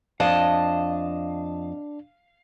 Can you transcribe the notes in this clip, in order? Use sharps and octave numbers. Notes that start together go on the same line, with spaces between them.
F2 D4 D#5 F5 A5